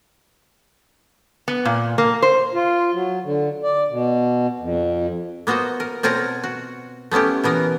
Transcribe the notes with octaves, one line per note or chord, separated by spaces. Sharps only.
B3
A#2
A#3
C5
F4
F#3
D3
D5
B2
F2
A#3 B3 F#4 C5 D#5
A#4
B2 C4 F4 A#4 C#5 A#5
F#4
A3 B3 C#4 E4 G4
B2 E3 B3 A#4